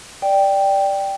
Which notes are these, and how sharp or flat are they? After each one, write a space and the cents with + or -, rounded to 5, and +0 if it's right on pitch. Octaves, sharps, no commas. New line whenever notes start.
D5 +0 G5 +0